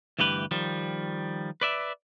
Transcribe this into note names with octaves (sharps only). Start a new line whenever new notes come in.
D2 G2 E3 G4 B4
D#3 F3 G3
B4 D5 E5